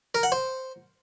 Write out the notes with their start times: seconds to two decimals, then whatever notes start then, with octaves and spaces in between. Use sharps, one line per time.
0.15 A#4
0.23 F#5
0.32 C5